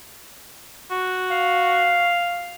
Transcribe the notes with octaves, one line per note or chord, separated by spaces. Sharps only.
F#4
F5